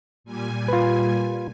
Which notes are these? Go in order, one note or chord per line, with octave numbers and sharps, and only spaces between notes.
A#2 G3 G#5
F4 B4